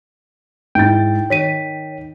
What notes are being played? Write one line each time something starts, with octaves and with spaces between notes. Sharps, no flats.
G#2 E4 G5 A6
D#3 C#5 B6 D#7